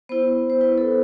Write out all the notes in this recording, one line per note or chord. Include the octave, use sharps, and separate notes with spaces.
B3 E4 C5
C5
B3 E4 B4
A4